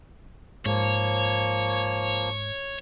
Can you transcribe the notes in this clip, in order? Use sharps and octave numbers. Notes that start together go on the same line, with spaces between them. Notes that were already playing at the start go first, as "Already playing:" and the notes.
G#2 F3 A#3 C#5